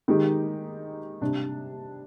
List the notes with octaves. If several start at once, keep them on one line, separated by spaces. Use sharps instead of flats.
D#3 G#3 D#4 G4
C3 G3 D4